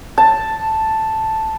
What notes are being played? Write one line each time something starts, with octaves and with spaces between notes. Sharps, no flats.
A5